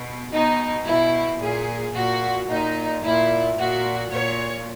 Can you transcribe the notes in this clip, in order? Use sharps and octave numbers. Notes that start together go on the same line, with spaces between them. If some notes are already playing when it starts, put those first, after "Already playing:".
Already playing: B2
B2 D#4
B2 E4
A#2 G#4
A#2 F#4
A#2 D#4
A#2 E4
A#2 F#4
A#2 C#5